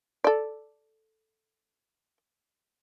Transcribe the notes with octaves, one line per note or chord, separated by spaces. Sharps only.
A4 D5